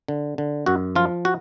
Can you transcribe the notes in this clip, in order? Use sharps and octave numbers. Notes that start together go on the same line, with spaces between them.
D3
D3
F#2 F#4
F3 F4
F#4